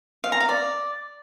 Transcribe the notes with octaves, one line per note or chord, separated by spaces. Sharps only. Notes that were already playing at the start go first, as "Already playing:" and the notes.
F5
A#5
F5
D5